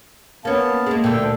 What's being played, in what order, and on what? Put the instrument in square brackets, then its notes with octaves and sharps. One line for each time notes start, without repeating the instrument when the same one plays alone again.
[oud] A#3 C#4 [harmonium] B3 F5 A5
[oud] G#3 A#3
[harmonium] D2 A4 G5 [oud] A#2 D3 G3